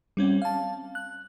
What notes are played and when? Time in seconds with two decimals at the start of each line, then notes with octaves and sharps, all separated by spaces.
0.17 G3 C4 C#4
0.42 F5 A5
0.95 F#6